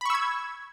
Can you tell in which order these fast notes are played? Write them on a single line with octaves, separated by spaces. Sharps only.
B5 C#6 E6 G#6